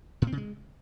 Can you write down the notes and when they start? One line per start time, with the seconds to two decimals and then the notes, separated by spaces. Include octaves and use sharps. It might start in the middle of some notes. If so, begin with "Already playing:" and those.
0.22 A2
0.27 C4
0.32 C#3
0.37 G#3